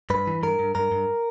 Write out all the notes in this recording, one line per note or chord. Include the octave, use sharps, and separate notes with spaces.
G2 B4
E3
G2 A#4
G2
G2 A#4
G2